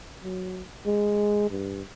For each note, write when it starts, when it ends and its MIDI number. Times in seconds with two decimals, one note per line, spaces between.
0.24 0.65 54
0.86 1.50 56
1.50 1.83 43